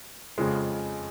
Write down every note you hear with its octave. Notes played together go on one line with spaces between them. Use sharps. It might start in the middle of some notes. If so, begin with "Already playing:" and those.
F2 C#3 F3 G#3